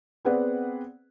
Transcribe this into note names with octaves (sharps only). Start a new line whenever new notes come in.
B3 C4 G#4 B4 D5 F#5